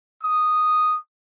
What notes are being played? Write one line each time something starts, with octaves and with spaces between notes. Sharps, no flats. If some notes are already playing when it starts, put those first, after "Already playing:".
D#6